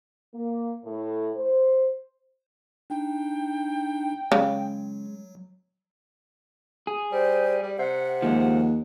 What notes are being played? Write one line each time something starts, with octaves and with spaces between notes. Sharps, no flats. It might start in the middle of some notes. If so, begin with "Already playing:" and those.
A#3
A2
C5
D4 D#4 G5
C#3 F#3 G#3
G#4
G3 C5
G3
C3 F#5
D#2 F3 G#3